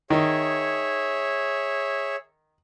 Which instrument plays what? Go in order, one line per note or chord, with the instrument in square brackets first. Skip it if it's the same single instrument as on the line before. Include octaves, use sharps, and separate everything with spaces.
[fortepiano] D#3 [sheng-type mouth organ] G#4 C#5 E5